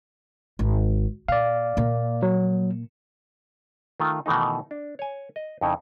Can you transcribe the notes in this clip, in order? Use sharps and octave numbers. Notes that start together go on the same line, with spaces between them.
G#1
A#2 D5 F5
A#2 A#3
F#3
D#3 A3 F4
B2 D#3 E3 A3 D#4
D4
C#5 G#5
D#5
F2 C#3 D#4 E4